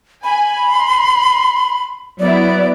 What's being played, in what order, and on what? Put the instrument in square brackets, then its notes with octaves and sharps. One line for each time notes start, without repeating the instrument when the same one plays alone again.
[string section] G#5 [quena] B5
[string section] C6
[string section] F#3 B3 E4 [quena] D5